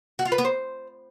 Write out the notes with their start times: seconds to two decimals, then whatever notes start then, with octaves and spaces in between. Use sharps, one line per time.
0.19 F#4
0.25 F4
0.32 B4
0.38 B3
0.45 C5